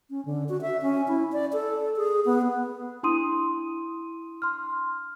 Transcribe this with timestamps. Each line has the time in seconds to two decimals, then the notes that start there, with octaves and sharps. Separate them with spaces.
0.10 C#4
0.26 D3
0.49 F#4
0.62 E5
0.82 C#4
1.08 E4
1.32 D5
1.53 A4
1.97 G#4
2.25 B3
3.03 D4 E4 C6 D#6 D#7
4.42 C6 F6